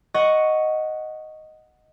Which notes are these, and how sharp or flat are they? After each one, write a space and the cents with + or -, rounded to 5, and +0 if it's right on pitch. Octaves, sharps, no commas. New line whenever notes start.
D#5 +0 F#5 +0 C#6 +5